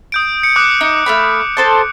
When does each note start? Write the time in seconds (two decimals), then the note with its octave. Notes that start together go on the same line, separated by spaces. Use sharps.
0.12 D#6 G6 D7
0.43 C#7
0.56 D6 D#6 F#6
0.81 D#4
1.06 A3 F5 B5
1.57 A4 C5 A5